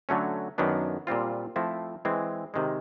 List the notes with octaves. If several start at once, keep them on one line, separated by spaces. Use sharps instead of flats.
D3 F#3 A3 C#4
F#2 D#3 F#3 B3 D4
A#2 G3 C4 F4
F3 A3 C4 E4
E3 G#3 C4
C3 D#3 G#3